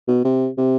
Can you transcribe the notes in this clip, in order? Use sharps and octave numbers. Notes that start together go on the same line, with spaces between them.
B2
C3
C3